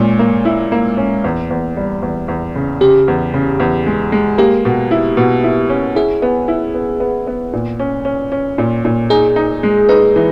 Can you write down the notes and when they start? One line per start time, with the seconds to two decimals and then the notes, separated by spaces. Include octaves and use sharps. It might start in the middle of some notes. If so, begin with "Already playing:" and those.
Already playing: A#2 G#3 C#4
0.19 A#3
0.45 E4
0.72 A#3
0.97 C#4
1.24 E2
1.50 E2
1.77 G3
2.02 E2
2.28 E2
2.56 C#3
2.81 C#3 G4
3.08 E2
3.34 C#3
3.60 E2
3.86 G#3
4.12 G#3
4.38 A#3 G4
4.65 B2
4.91 E4
5.17 B2
5.44 E4
5.70 C#4
5.95 E4 G#4
6.22 B3
6.48 E4
6.74 B3
7.00 B3
7.27 B3
7.53 A#2
7.80 C#4
8.05 C#4
8.32 C#4
8.58 A#2
8.85 A#2
9.10 D#4 G#4
9.36 D#4
9.63 G#3
9.89 D#4 B4
10.16 E3